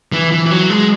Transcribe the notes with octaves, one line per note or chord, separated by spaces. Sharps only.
E3
E3
E3
F#3
G#3